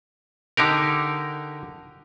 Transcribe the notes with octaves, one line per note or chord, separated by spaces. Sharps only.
D3 D#4 G4 A#4